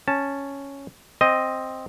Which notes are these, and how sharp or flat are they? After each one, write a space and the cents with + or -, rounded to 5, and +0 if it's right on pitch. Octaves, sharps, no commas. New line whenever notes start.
C#4 +0 A5 +0
C4 +0 D#5 +0